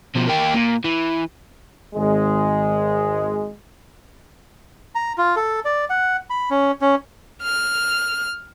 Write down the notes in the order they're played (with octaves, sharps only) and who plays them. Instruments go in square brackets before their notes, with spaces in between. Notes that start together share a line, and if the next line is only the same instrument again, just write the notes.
[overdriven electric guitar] B2 F3
A#3 G4
A#2
E3
[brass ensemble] G#1 G#3
[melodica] A#5
F4
A4
D5
F#5
B5
C#4
C#4
[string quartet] F6